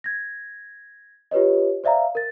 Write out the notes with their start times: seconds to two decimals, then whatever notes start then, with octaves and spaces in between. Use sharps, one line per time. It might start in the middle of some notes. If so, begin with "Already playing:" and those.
0.04 G#6 A#6
1.31 F4 G4 B4 C#5 D#5
1.84 C5 D5 E5 F5 A#5
2.15 A#4 A6